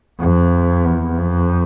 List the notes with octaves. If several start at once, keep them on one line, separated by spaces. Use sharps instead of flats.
F2
E2
F2